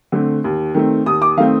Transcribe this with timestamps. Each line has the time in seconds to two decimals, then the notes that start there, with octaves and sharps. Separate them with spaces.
0.12 D3 A3 C4
0.44 D#2
0.74 D#3 A3 C4
1.06 D#2 D#6
1.22 D6
1.37 D#3 A3 C4 F5